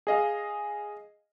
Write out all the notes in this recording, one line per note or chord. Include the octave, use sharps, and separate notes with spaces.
G#4 D#5 F5